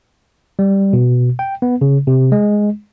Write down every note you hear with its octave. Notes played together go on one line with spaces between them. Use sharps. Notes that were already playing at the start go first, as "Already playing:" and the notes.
G3
B2
G5
B3
C#3
C3
G#3